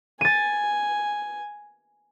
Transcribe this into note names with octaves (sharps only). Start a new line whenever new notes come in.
G#5 A6 D#7